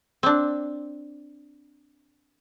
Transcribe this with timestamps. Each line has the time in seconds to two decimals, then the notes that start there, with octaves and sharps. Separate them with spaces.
0.23 C4 D4